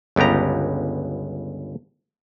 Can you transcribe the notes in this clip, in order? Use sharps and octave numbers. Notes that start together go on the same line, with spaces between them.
G1 C#2 B3 G4 A#5